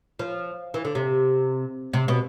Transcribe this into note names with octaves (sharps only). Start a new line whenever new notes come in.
F3
E3
D3
C3
C3
B2